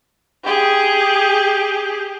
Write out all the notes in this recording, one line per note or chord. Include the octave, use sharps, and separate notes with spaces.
G4 G#4